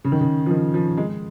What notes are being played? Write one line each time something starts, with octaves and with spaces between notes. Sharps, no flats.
C#3
D#3
C#3
F3
D#3
F3
G#3